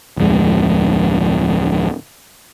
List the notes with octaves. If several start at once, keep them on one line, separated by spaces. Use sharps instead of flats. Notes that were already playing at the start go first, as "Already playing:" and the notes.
D1 F2 G#3